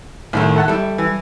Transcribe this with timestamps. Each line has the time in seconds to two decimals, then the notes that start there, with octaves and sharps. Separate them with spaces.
0.33 C2 A2 D#3 A3
0.56 A4 F#5 A5
0.68 G3 E4 A4
0.98 E3